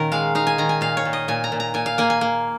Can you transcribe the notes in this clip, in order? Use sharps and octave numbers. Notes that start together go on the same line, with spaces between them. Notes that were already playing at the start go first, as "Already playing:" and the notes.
Already playing: A#2 D#3 C#4 A#4
G#3 F5
D#4 F5
G#5
D#3 A#5
G#5
A#2 F5
C#5
A#2
D#5
A#2 G#5
A#5
A#2
A#5
A#2 G#5
F5
A#3 G#5
G#5
A#3